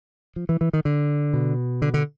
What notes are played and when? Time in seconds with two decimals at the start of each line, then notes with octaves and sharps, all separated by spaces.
0.36 F3
0.49 E3
0.61 E3
0.73 D#3
0.85 D3
1.34 B2
1.82 D3
1.94 D3